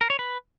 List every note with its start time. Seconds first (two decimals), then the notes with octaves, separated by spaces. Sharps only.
0.01 A#4
0.10 C#5
0.19 B4